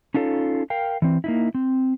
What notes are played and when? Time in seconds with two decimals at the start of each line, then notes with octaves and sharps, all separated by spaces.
0.14 C#4 D#4 F4 A4 C#5
0.70 A#4 F5 G5
1.02 E3 C4
1.24 A#3 D#4 E4
1.55 C4